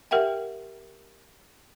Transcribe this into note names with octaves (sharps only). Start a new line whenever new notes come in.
G4 A#4 E5 F#5 G5